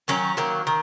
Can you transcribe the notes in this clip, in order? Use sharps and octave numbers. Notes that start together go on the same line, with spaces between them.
D#3 F#3 A#3 C#4
D#3 F#3 A#3
D#3